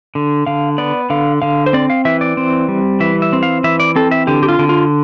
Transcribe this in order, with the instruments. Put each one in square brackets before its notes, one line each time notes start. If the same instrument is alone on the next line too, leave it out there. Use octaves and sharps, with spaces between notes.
[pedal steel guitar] D3
D3 F5
B3 D5
D3 F5
D3 F5
C5
C4 D5
F5
E3 E5
D5
C4
G3
E3 E5
E5
C4
F5
E3 E5
D5
C4 A4
E5
D3 G4
G4
F4
D3
F4